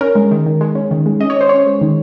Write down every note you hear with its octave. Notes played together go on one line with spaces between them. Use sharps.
C#4 A#4
G#3
D#3
D#3
G#3
C#4
D#3
G#3
C#4 D#5
C#5
C#4 C5
C#4 C#5
G#3
D#3